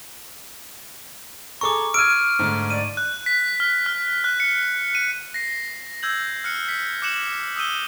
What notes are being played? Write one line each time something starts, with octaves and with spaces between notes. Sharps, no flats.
G#4 A4 A#5 C#6 D6
E6 F6 G#6 D7 D#7
G#2 D3 A3
D5 D#7
F#6
B6
F6
F6
F#6
C#7
D#7
A#6 C7
E6 G6 G#6 F#7
F6 F#6 C#7
B6
D6 F#6 C#7 E7 F#7
D#6 E6 G6 D#7 G7